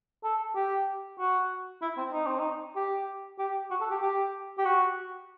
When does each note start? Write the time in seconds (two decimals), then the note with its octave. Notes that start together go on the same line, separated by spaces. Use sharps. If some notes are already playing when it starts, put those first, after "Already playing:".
0.24 A4
0.56 G4
1.19 F#4
1.82 E4
1.97 C4
2.13 D#4
2.26 C4
2.39 D#4
2.76 G4
3.39 G4
3.70 F#4
3.81 A4
3.91 G4
4.02 G4
4.59 G4
4.65 F#4